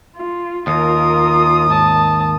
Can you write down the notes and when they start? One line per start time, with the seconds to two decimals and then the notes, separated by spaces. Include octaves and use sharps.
0.16 F4
0.67 D#2 F4 A#4 D#6
1.70 G#2 A5